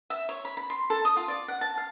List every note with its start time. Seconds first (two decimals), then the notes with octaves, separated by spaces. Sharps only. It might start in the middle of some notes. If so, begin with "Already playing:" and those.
0.10 E5
0.29 C#5
0.45 B5
0.57 B5
0.70 C6
0.90 A4
1.05 D#6
1.17 F4
1.28 D5
1.48 F#5
1.61 A5
1.77 F5